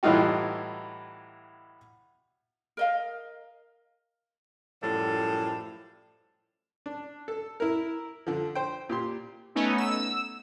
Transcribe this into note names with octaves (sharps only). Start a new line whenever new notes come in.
A2 E3 G3 D#4 F4 F#4
A#4 D#5 F5
F#2 A2 F3 G3 A4
D4
A4
E4 A#4
D3 F3
C5 G5
A#2 G4 C6
A3 B3 C#4 D#4
E6